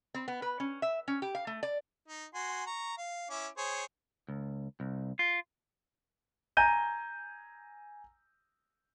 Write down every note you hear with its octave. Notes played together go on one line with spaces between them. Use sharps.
C4
B3
B4
C#4
E5
C#4
G4
F5
A3
D5
D#4
F#4 G#5 C6
A#5 C#6
F5
C#4 E4 D6
G#4 C5 C#5
C#2
C2
F4
G#5 A#5 G6 D#7